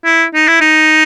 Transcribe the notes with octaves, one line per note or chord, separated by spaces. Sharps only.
E4
D#4
E4
D#4